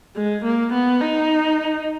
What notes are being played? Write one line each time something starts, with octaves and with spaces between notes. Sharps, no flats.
G#3
A#3
B3
D#4